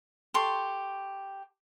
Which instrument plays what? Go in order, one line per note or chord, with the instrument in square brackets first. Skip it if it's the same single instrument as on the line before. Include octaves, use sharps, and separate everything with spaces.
[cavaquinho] G4 A4 C6 C#6